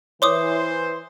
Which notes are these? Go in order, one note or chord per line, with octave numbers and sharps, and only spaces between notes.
E3 A#4 C5 C#5 C6 D6 D#6